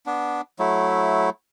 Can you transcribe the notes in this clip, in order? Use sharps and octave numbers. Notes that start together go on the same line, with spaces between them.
B3 D4
F#3 A3 E4